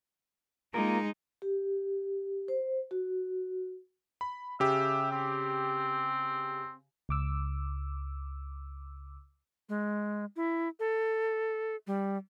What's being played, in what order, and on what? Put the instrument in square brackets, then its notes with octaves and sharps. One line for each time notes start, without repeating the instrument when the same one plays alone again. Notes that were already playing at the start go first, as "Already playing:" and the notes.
[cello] G#3 D#4 [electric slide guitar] A#3 F4 A#4
[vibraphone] G4
C5
F#4
[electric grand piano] B5
[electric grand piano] C#3 G4 [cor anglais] E5
[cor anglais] C4
[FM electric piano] C#2 D6 E6
[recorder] G#3
E4
A4
G3